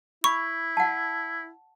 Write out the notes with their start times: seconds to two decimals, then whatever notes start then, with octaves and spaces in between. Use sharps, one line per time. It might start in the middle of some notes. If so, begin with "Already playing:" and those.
0.24 E4 B5 C#6
0.77 F#5 A5